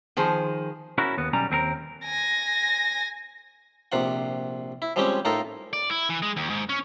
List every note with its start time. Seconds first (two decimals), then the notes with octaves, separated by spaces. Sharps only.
0.17 D#3 F3 G#4 C5
0.98 C#4 E4 F#4 A#4
1.18 D#2 B3
1.33 B1 G3 C#4 A#5
1.50 D#2 C4 G#4 A#4
2.04 G#5 A#6
3.92 A#1 C3 F4 F#5
4.82 E4
4.96 F3 G3 G#3 C4 C#4 G4
5.25 A2 D#4 F4 A4 A#4 F5
5.73 D5
5.91 E4
6.10 E3
6.22 G#3
6.36 D#2
6.50 G#2
6.69 C#4